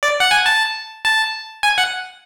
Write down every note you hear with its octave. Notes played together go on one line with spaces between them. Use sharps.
D5
F#5
G#5
A5
A5
G#5
F#5